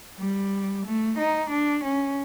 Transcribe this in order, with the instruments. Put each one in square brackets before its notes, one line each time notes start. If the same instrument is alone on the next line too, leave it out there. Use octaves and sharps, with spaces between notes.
[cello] G3
A3
D#4
D4
C#4